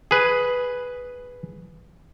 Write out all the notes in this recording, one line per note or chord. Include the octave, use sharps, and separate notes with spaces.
G#4 B4